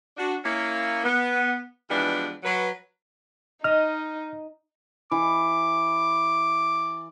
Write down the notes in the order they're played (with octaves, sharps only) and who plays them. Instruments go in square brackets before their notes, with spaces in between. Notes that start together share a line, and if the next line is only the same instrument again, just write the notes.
[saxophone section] D4 F#4
A#3 C#4 E4
B3
E3 F3 G3 G#3 B3 D4
F#3 B4
[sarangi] D#4 [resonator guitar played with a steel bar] D#5 [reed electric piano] F6
[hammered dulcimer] E3 [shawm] D6